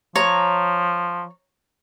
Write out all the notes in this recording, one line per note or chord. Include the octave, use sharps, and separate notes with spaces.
F3 C#5 A#5